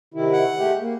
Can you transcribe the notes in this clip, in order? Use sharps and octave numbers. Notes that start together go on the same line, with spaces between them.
C3 D#3 E4
F#5
G#3 A3 G4
A#3